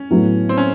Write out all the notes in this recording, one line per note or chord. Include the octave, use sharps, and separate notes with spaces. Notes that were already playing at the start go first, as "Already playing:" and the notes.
Already playing: C#4
A2 F#3 B3
C4
C#4